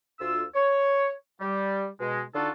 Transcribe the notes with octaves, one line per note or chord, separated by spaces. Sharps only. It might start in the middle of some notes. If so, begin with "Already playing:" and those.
D2 F4 E6
C#5
G3
B2 G#3
D3 D4 D#4 F4 F#4 A4